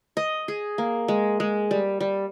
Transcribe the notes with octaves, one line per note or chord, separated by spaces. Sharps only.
D#5
G#4
A#3
G#3
G#3
G3
G3